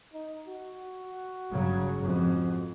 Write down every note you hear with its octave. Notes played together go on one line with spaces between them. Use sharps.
D#4
F#4
G1 C#3 F#3
F2 G#2